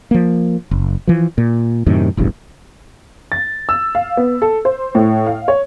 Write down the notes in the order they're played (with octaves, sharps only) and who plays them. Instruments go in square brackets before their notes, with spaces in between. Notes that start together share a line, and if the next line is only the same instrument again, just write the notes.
[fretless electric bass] F3 A#3
F#1
E3 F3
A#2
F#2 A2 C3 D#3
E1 A1 E2 G2
[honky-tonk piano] A6
E6
F5
B3
A4
C5
A2
F5
C#5